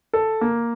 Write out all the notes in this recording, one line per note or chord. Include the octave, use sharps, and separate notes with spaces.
A4
A#3